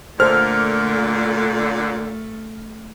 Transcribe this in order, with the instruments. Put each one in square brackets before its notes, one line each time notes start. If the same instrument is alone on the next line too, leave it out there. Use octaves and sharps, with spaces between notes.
[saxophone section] A#2 D3 [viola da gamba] A3 [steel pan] A4 C5 [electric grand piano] F6